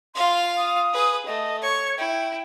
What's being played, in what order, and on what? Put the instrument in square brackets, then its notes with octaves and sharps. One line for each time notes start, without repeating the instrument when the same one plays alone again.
[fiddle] F4 F5 [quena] C6
[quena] D#6
[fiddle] G#4 B4
[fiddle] A3 [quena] D#5
[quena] C#5 [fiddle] C#6
[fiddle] E4 [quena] G5